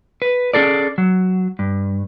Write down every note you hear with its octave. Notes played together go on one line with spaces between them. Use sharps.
B4
C#4 D4 G#4 A4 D5
F#3
G2